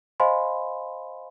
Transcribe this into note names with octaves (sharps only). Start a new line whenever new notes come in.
C5 D#5 F5 G#5 B5 C6